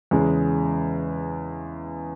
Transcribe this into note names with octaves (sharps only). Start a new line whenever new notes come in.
E2 C#3 G#3